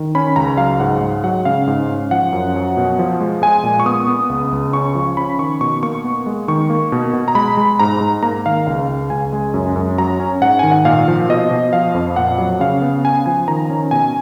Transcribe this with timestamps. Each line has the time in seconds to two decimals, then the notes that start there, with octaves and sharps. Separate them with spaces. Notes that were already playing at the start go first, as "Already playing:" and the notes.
Already playing: D#3
0.15 C#4 B5
0.36 C#2 A#5
0.57 F#3 F5
0.80 G#2 F#5
1.01 G#3
1.24 F#3 F#5
1.45 C#3 F5
1.67 G#2
1.90 C#4
2.11 F3 F#5
2.32 F#2
2.55 F#3
2.77 B2
2.99 F3
3.21 G#3
3.42 G#3 G#5
3.64 A#2
3.80 C#6
3.86 B3 D#6
4.08 B3
4.30 C#2
4.52 C#2
4.73 C#4 C#6
4.95 F3
5.17 C#4 B5
5.39 D#3 C#6
5.61 B2 C#6
5.83 A#3 C#6
6.04 B3
6.26 G#3
6.48 D#3 C#6
6.70 A#3
6.92 B2
7.13 B2
7.28 A#5
7.35 G#3 B5
7.57 G#3
7.79 G#2 A#5
8.01 G#2
8.23 A#3 A#5
8.46 D#3 F5
8.67 C#2 F5
8.89 C#2
9.10 C#2 G#5
9.32 G#3
9.54 F#2
9.76 F#2
9.98 F#3 A#5
10.20 C#4
10.41 G#2 F#5
10.59 D#3 G#5
10.72 F#5
10.85 A#2 F5
11.08 F3
11.29 B2 D#5
11.51 B2
11.73 F3 F5
11.94 F2
12.16 A#2 F#5
12.38 F#3
12.60 C#3 F5
12.82 B3
13.04 C#4 G#5
13.26 F3 G#5
13.48 D#3 A#5
13.70 C#4
13.91 B2 G#5